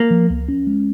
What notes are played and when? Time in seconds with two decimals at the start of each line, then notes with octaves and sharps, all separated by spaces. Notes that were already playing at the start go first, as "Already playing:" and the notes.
Already playing: A#3
0.11 F3
0.30 C#2
0.49 C#4
0.67 G#3